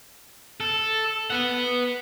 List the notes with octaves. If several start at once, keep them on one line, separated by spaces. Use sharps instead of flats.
A4
B4 F#5